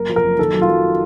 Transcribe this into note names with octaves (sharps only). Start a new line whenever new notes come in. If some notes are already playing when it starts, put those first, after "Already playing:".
Already playing: F#1 A#4
F3
A#4
F#1
D#3 A4
F#3
F4
F#3